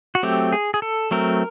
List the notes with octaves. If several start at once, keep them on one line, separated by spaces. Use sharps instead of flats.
F#4
F#3 A3 C4 G4
G#4
G#4
A4
F#3 A3 C4 A#4